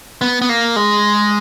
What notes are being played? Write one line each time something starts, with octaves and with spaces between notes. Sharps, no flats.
B3
B3
A#3
G#3